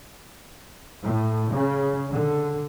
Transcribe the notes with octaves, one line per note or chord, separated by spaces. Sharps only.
A2
C#3
D3